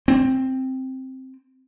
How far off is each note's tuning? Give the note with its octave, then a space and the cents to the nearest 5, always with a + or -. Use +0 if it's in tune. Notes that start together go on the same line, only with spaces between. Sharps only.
C4 +0